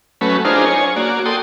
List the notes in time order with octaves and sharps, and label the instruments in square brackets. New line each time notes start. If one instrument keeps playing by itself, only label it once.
[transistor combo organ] F#3 A3 C#4 B4
D4 D#4 F4 G#4 A#4 C5
C#5 G#5
A#3 F#4 D5
A4 G5 C6 D#6